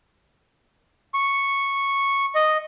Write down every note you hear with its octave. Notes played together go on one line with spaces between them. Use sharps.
C#6
D#5